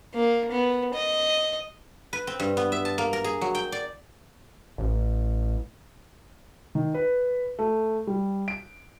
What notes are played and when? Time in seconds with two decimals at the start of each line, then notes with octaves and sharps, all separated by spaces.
0.14 A#3
0.51 B3
0.94 D#5
2.13 B4
2.27 C4
2.40 G2
2.57 B3
2.72 E5
2.85 A5
2.98 A#3
3.13 A#4
3.24 G#4
3.41 F#3
3.55 G5
3.72 D5
4.78 A1
6.75 D#3
6.94 B4
7.59 A3
8.07 G3
8.48 D7